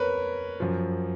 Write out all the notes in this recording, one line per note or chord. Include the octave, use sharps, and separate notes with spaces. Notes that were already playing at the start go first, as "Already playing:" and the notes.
Already playing: F2 A#4 B4 C#5
F#2 F3